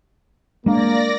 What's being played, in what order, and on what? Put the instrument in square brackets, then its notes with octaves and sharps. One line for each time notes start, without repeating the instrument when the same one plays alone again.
[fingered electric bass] G#3 D4 [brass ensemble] A#3 [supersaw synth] D5 A#6